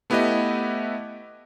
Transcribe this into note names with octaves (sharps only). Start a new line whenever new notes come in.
A3 B3 E4 G4 B4 D#5